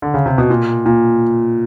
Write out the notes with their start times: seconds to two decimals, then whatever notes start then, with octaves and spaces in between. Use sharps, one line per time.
0.02 D3
0.14 C#3
0.26 C3
0.38 B2
0.50 A#2
0.86 A#2